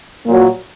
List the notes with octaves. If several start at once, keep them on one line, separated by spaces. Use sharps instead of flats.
A#2 F#3